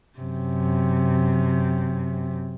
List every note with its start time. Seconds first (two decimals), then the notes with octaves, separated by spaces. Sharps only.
0.18 F#2 C3